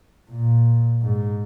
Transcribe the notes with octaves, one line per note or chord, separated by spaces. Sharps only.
A#2
G#2